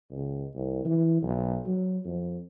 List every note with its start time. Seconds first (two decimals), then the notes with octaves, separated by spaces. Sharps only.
0.11 C#2
0.55 C2
0.85 E3
1.22 B1
1.67 F#3
2.05 F2